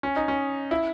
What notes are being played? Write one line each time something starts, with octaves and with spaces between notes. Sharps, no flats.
C#4
D#4
C#4
E4